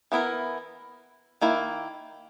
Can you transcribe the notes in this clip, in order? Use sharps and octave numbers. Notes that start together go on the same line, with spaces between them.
E3 B3 E4 A#4
D#3 A#3 E4